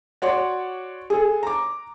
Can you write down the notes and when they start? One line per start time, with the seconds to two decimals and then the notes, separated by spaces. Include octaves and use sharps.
0.22 F#4 C#5 D5 C6
1.10 G#4 A4
1.43 A#5 D6